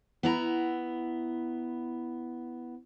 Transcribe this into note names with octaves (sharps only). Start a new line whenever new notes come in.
B3 E4 A#5